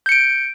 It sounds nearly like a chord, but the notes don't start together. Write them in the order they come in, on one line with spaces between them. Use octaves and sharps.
G6 C#7 D7